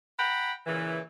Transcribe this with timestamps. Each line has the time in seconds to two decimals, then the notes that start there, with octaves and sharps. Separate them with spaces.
0.18 F#5 G5 A#5 B5
0.66 A#2 C#3 E3